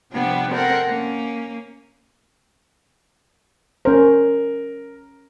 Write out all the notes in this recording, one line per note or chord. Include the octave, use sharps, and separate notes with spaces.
C3 F3 G3 B3 D4
C4 A4 A#4 F#5
A#3 C#4
C#4 A#4 C5